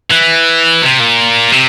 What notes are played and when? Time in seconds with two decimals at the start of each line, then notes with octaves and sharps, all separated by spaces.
0.11 E3
0.82 C3
0.99 A#2
1.52 C3